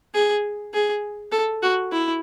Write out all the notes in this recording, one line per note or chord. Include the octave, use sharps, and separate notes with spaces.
G#4
G#4
A4
F#4
E4